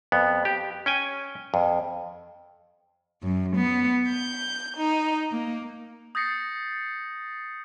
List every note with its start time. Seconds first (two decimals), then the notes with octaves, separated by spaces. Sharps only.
0.12 F2 B3
0.45 G4
0.86 C#4 G5 G#5
1.54 F2
3.24 F#2
3.56 B3
4.10 G6
4.77 D#4
5.32 A#3
6.15 D#6 G6 A6 A#6 C7 C#7